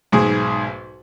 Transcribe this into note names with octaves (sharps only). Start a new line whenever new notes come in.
B1 G#2 G#4